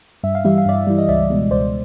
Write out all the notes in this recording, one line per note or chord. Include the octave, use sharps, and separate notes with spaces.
G2 E5
F5
E3 G3 E5
F5
G2 D5 E5
E3 G3
D#5
C#2 D5 E5
B2 G#3
C#2 C5 D5